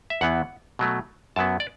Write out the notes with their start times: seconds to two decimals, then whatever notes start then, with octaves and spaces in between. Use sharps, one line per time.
0.10 E5
0.21 E2 E3 B3 F#5
0.79 B2 F#3 A3
1.36 F#2 F#3 B3 A5
1.60 D5